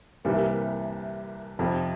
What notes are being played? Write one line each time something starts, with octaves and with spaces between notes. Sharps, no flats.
C2 C3 E3 G3 A#3
F2 C3 F3